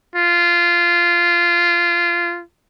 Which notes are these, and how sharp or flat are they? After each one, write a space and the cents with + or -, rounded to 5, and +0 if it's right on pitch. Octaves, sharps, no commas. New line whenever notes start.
F4 -15